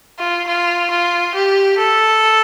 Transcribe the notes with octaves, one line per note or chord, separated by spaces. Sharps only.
F4
F4
F4
G4
A4